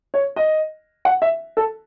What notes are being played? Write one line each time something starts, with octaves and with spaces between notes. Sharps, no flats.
C#5
D#5
F#5
E5
A4